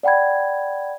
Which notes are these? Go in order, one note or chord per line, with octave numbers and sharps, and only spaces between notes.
D5 F#5 G5 B5 G#6